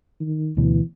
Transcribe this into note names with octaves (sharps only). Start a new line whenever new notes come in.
D#3
D2 B2 E3